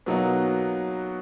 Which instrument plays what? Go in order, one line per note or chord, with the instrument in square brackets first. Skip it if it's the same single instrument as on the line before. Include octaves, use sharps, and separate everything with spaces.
[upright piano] B2 F#3 A#3 D#4 F#4